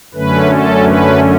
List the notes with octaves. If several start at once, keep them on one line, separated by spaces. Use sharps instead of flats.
F#2 D3 A3 C#4 B4
A4
B4